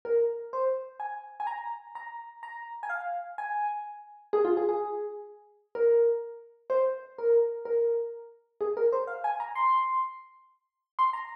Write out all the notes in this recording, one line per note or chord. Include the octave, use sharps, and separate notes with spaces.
A#4
C5
G#5
G#5
A#5
A#5
A#5
G#5
F5
G#5
G#4
F4
G#4
G#4
A#4
C5
A#4
A#4
G#4
A#4
C5
F5
G#5
A#5
C6
C6
A#5